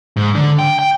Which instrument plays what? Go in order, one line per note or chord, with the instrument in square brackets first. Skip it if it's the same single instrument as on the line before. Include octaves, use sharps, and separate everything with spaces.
[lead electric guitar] G#2
D3
G5
G5